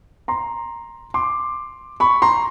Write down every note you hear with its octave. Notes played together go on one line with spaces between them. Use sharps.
A#5 C6
C6 D6
B5 C#6
A#5 C6